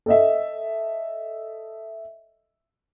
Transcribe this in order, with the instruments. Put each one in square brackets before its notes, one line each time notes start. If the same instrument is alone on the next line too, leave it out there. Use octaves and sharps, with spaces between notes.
[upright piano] A4 D#5 E5